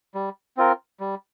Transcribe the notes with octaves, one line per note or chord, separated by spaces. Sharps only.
G3
C4 F4 A#4
G3